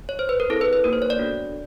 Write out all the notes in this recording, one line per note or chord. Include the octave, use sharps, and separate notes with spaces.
C#5
C5
B4
A#4
C4 E4 G#4 A4
B4
B4
A#3 D#4 F#4 A4 A#4
C5
C#5
D5
B3 D4 F#4 A4